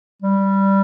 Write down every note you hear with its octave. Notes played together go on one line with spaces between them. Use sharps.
G3